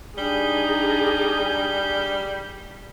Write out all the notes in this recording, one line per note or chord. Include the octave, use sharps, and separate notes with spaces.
G3 D4 D#4 G#4 G6